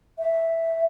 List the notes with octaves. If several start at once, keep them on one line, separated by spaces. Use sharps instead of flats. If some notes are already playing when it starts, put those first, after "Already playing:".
E5